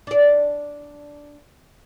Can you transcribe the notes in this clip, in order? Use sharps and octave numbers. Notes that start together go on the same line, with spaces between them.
D4 D5